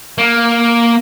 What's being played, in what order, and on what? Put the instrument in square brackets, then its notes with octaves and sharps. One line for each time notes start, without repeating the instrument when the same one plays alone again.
[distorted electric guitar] A#3